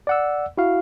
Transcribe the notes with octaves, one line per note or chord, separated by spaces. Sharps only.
D5 F#5 E6
E4 F#4 F5